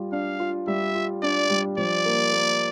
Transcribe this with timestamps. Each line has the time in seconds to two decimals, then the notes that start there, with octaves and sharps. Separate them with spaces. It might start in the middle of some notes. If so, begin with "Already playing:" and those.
Already playing: G3 F4
0.12 D4 F5
0.40 F4
0.67 G3 E5
0.95 F4
1.23 D4 D5
1.50 G3
1.78 F3 D5
2.05 A#3
2.33 A#3